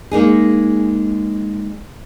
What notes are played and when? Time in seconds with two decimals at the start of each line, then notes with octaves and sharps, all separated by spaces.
0.11 G#3 A#3 D#4 G#4